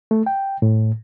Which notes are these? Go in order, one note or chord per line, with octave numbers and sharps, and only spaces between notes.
A3
G5
A2